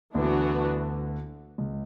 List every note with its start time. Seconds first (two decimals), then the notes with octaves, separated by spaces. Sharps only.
0.14 D2 D3 E3 B3 D4 F#4
1.58 C#2 C#3